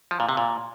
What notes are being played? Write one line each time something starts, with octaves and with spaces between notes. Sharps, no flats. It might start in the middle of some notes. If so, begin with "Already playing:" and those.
F3
A#2
C3
A#2